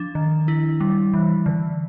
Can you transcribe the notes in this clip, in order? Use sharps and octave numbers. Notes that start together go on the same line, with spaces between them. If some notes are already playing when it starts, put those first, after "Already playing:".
Already playing: F3 D4
D#3
E4
G3
E3
D3